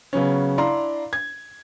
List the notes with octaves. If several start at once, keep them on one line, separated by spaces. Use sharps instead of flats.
C#3 F#3 B3 C#4
D4 E4 D5 F5 A#5 C6
G#6